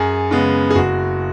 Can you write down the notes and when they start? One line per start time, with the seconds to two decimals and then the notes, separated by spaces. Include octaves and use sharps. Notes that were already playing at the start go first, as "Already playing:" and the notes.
Already playing: F#2 G#4
0.31 C#3 G#3 B3
0.70 G#4
0.75 F#1 F#4